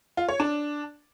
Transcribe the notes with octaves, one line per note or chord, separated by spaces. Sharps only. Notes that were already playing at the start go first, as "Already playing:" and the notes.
F4
C#5
D4